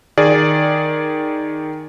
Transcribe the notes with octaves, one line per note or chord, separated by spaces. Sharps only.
D#3 G#4 D5